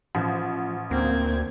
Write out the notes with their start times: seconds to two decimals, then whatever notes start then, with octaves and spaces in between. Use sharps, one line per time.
0.15 A1 F3
0.91 D2 A#3 C4 G#6